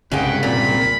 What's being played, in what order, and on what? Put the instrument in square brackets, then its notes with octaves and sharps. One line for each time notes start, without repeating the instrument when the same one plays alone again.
[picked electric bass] C2 G2 C#3 [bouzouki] G#3 G5 [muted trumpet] B4 [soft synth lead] F#5
[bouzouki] A#2 [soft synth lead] C4 [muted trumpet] B5